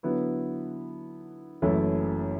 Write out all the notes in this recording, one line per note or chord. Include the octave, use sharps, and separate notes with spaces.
D3 F#3 B3 E4 B4
F#1 F#2 E3 A3 E4